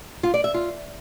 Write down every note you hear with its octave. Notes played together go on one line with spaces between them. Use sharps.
F4
D5
E5
F4